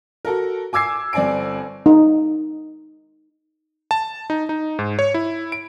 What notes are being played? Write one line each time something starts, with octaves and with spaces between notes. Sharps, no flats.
F#4 A4 A#4
G#5 D6 E6 G#6 C7
G1 C4 D5 G#5 D7
D#4
A5
D#4
D#4
G#2
C#5
E4
D7